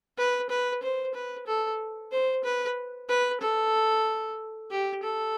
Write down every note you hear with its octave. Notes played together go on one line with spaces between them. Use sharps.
B4
B4
C5
B4
A4
C5
B4
B4
A4
G4
A4